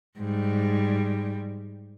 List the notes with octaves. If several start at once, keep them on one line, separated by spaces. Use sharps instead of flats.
G#2 G3